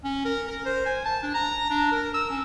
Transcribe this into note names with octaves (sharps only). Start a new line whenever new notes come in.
C#4
A#4
A#4
C5
G#5
A5
D4
A#5
D4
A#4
E6
C#4